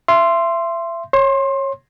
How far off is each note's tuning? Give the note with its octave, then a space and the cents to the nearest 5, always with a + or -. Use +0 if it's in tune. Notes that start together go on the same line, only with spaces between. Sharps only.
E5 +30 C6 +0
C#5 -20 C6 +20